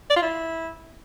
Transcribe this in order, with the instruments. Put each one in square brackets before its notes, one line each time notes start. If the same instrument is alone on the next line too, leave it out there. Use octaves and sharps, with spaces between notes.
[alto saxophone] D5
F4
E4